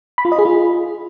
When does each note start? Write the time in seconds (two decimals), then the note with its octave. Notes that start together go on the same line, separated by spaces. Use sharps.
0.18 B5
0.25 F4
0.32 D#5
0.39 G#4
0.45 F4